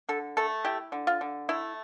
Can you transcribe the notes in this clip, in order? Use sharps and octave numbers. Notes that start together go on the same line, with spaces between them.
D3 A4
A3 A4
E4 G4
D3
F4
D3
A3 E4